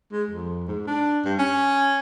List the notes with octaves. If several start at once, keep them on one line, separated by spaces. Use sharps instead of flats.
G#3
F2
G#2
D4
G2
C#4